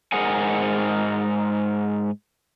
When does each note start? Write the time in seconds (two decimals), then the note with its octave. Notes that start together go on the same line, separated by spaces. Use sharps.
0.12 G#2 G#4 A#4 F#5 G#5